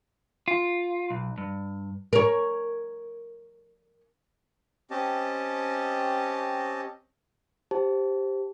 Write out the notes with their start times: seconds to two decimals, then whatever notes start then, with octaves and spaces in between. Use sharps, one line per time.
0.48 F4
1.10 B1
1.38 G2
2.13 A#4 C#5
4.91 C4 C#4 G4 D#5 A5
7.71 G4 C5 A5